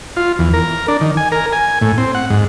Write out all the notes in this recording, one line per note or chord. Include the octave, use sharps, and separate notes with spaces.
F4
E2
A#4
D4
D#3
G#5
A#4
G#5
A2
C4
F#5
G#2